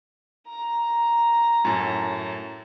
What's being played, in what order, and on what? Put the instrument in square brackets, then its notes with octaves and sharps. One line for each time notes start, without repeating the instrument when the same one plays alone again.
[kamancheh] A#5
[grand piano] F#2 A2